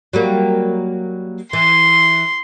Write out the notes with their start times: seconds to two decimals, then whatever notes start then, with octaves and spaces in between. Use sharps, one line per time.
0.13 F#3 G3 A#3
1.53 E3 C6